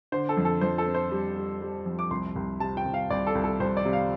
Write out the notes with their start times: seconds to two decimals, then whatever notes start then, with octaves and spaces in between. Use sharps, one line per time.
0.12 D3 C5
0.29 A4
0.37 F2
0.45 A4
0.61 F2 C5
0.78 A4
0.87 C4
0.95 C5
1.11 G3
1.36 G3
1.61 G3
1.86 F2
1.99 D6
2.11 C2 C6
2.36 C2
2.60 C3 A5
2.77 G5
2.85 C2
2.94 F5
3.10 C2 D5
3.27 A4
3.35 C2
3.44 A4
3.60 C2 C5
3.77 D5
3.85 C3
3.93 F5